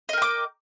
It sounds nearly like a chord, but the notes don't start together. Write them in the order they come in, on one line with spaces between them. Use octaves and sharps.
D#5 A#4 G5 D6